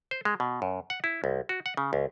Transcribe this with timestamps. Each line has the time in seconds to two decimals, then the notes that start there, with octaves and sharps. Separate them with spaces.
0.11 C5
0.25 G#3
0.40 B2
0.62 F#2
0.90 F#5
1.04 E4
1.24 C2
1.49 F#4
1.66 F#5
1.77 C#3
1.93 C#2